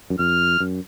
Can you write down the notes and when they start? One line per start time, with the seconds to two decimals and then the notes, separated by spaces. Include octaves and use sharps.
0.10 F#2
0.19 F2 F6
0.60 F#2